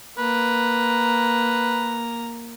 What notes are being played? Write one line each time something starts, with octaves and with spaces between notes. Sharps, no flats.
A#3 B4 A#5